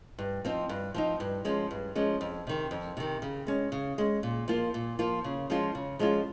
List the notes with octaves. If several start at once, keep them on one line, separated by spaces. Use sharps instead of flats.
G2
F3 C4 D#4
G2
F3 C4 D#4
G2
F3 G#3 C#4
G2
F3 G#3 C#4
F2
C3 D#3
F2
C3 D#3
C#3
G#3 C#4
C#3
G#3 C#4
A#2
F3 A#3 F4
A#2
F3 A#3 F4
C#3
F3 G#3 C#4 F4
C#3
F3 G#3 C#4 F4